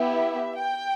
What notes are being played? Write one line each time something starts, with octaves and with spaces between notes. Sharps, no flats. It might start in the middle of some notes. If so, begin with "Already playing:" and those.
Already playing: B3 E4 G4 E5
G5